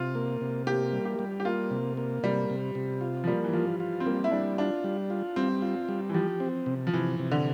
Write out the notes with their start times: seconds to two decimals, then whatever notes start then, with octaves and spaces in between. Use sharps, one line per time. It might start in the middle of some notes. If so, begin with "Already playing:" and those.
Already playing: C3 F4
0.15 A#3
0.41 C3
0.67 A#3 G4
0.92 G3
1.05 G4
1.19 G3
1.40 G4
1.45 A#3 F4
1.71 C3
1.97 A#3
2.23 C3 G3
2.50 C3
2.75 C3
3.01 F4
3.24 F3
3.27 G3 A#3
3.44 E3
3.53 F3 F4
3.80 F4
4.00 C4
4.06 G3 A#3
4.24 E4
4.31 G3 D4
4.58 D4 F4
4.84 G3
5.10 F4
5.36 G3 C4
5.62 F4
5.89 G3
6.09 E3
6.14 F3 G4
6.40 C4
6.66 C3
6.87 F3
6.93 C3 E3
7.19 C3
7.31 D3